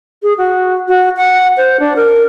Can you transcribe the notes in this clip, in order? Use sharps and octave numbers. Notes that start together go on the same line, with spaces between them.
G#4
F#4
F#4
F#5
C5
D4
A#4